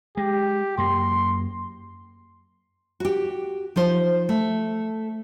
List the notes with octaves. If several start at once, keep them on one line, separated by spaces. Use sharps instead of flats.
G#3 G4
F#2 A#3 C6
F#4 G4
F3 D#4 C5
A3